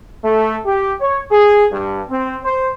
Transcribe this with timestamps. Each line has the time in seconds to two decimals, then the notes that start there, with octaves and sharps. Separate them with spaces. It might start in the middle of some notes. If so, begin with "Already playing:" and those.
0.25 A3
0.66 G4
1.01 C#5
1.32 G#4
1.72 G2
2.10 C4
2.44 C5